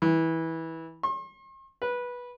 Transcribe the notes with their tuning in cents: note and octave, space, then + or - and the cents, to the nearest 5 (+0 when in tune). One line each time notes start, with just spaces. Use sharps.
E3 -20
C6 +45
B4 -15